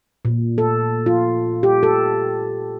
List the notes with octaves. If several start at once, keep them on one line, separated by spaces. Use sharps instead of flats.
A#2
A4
F4
G4
A4